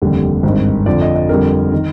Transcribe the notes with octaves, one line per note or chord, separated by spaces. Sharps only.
F1 D#2 D3 G3
G#1 G2 D#3
F2 D3 F3 D5
D#5
D#5
F2 D3 G3 A#4
D#3